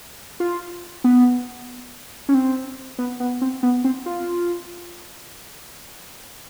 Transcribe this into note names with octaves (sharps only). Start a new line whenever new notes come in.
F4
B3
C#4
C4
B3
B3
C4
B3
C4
F4